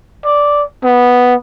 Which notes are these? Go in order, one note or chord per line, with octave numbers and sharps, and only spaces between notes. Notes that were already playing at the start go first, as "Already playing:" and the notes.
D5
B3